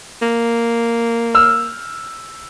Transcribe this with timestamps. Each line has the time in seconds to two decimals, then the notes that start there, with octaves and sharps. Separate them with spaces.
0.22 A#3
1.35 E6 F6